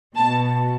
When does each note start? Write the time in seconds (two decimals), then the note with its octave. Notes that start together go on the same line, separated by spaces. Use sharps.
0.16 B2 A5